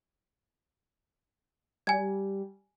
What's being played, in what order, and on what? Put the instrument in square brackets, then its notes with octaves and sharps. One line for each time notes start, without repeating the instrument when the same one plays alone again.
[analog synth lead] G3 [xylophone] G#5 G#6